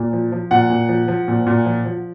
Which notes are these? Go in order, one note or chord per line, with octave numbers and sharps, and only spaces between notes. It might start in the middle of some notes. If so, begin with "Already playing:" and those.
Already playing: A#2
F3
F3
A#2 F#5
A#2
F3
F3
A#2
A#2
F3
F3